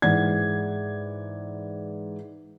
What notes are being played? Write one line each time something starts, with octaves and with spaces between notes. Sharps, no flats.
G#2 E3 D5 F#5 G#6